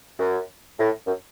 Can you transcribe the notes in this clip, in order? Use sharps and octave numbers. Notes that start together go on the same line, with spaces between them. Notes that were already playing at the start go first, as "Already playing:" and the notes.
F#2
A2
F#2